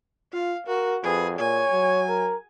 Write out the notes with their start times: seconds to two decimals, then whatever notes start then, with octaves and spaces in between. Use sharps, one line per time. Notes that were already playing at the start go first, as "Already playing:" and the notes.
0.33 F4 F5
0.67 F#4 A#4
1.04 F2 G#4 B4
1.39 A#2 C#5 G#5
1.71 F#3
2.09 A#4